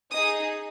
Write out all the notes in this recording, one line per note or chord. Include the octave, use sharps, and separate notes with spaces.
D#4 G#4 D#6